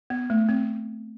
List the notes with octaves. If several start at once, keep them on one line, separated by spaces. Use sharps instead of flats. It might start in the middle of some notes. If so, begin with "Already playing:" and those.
B3
A3
C4